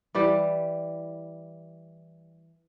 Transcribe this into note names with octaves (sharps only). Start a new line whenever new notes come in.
E3 G3 G4